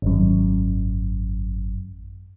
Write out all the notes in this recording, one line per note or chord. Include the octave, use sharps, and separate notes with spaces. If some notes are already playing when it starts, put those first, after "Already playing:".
G#1 F#2